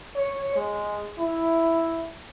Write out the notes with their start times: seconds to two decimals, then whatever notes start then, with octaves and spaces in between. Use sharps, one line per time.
0.16 C#5
0.56 G#3
1.19 E4